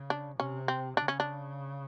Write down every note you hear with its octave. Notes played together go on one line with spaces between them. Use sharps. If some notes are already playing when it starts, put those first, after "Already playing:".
Already playing: C#3
D4
C3 C#4
C4
C#3 D4
C#4
D4